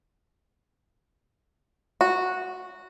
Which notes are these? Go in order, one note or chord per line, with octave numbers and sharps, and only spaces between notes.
F#4